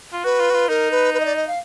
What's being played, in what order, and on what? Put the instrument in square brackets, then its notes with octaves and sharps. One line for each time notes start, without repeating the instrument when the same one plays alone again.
[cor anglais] F4
[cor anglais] F#4 [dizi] B4
[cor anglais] F4
F#4
F4
[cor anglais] D#4 [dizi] A#4
[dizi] B4
B4
D#5
D5
D#5
F5